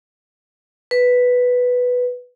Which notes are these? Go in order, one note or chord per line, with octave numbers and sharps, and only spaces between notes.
B4